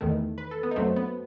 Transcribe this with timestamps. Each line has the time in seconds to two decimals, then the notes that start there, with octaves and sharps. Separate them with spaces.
0.01 E2 D#3 A3
0.38 B4
0.51 A4
0.63 B3
0.71 D#4
0.76 F#2 F#3 A3 C4
0.96 B3